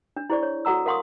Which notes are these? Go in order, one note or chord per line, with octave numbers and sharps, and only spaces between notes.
D4
E4 G#4 C5 D5 C#6
C#5
F#4 A4 F#5 A#5 E6
A#4 F5 F#5 C6 C#6 D#6